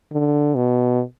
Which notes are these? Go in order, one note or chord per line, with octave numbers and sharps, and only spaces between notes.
D3
B2